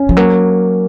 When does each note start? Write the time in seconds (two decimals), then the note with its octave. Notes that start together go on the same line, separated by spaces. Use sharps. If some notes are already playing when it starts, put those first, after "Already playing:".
Already playing: C#4
0.09 F3
0.17 F#3 A#3